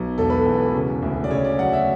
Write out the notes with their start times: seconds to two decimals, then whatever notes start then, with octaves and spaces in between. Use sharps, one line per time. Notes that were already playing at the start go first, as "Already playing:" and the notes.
Already playing: B1
0.18 E1 A4
0.30 B4
0.41 E2 A4
0.74 C#3
1.02 D2
1.24 D5
1.31 C#3 C#5
1.45 D5
1.59 F#3 F#5
1.73 E5